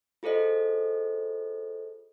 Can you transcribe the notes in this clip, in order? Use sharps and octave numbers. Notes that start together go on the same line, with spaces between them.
F4 G#4 A4 C5 D#5